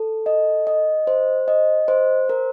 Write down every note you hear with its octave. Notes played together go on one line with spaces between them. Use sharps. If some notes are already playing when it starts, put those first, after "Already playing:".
Already playing: A4
D#5
D#5
C5
D#5
C5
A#4